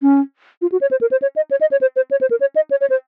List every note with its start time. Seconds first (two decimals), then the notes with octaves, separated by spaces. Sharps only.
0.02 C#4
0.62 F4
0.72 F#4
0.81 C#5
0.91 C5
1.01 A#4
1.11 C5
1.22 C#5
1.36 D#5
1.51 C#5
1.61 D#5
1.71 C#5
1.81 C5
1.96 C5
2.11 C#5
2.21 C5
2.31 A#4
2.41 C#5
2.56 D#5
2.71 C#5
2.81 C#5
2.90 C5